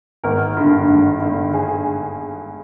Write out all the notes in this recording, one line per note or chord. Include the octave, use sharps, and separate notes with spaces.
G#1 A#4
G2 D3
G#1
G2 D3
G#4